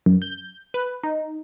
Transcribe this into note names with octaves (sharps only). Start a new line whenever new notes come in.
F#2
G6
B4
D#4